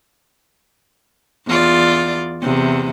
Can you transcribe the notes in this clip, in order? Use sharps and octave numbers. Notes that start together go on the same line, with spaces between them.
E2 F4 D5
E2 C3